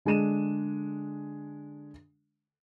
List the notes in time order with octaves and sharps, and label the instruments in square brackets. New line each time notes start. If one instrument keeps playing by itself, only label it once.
[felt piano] D3 G#3 D4 D#7 E7